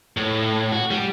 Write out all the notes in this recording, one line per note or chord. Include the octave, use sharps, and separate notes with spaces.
A2
F#4
G3